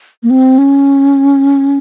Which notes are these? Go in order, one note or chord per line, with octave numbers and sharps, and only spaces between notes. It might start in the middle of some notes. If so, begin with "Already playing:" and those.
A#3
C4
C#4